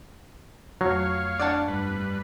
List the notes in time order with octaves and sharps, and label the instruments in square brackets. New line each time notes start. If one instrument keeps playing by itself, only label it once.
[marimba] F2 A3 [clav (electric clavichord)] F#3 [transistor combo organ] C#5 F5
[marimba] D4 [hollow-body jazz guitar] D5 F#5 A5
[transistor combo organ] G2 B4